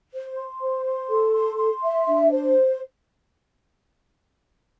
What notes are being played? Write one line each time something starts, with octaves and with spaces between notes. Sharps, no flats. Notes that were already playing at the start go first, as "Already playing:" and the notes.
C5
C6
C5
C6
A4
C6
C6
E5
D4
C5